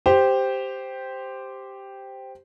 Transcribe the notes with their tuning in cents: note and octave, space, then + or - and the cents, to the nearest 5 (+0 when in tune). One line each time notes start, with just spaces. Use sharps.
G4 +0 C5 -5